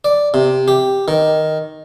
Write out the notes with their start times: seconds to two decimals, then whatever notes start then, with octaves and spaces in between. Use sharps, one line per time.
0.04 D5
0.34 C3
0.68 G4
1.08 D#3